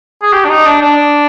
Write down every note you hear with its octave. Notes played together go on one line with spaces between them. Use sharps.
G#4
G4
D4
D#4
D4
D4